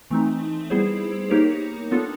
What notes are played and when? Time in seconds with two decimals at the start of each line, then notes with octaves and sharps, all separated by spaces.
0.11 E3 A3 C4 D#4
0.70 G3 B3 E4 G#4 C5
1.30 A#3 D#4 G4 A#4 C#5
1.91 B3 D4 F4 A4